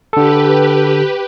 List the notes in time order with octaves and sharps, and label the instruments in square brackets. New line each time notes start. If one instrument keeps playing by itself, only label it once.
[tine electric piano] D3 A4 [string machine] G4 B4